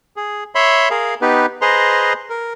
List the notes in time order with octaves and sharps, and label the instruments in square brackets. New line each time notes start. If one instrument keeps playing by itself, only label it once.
[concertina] G#4
C#5 E5 B5 C6
G#4 A#4 F5
B3 D#4 G4 B4
G#4 B4 C5 D#5 A#5 C6
A#4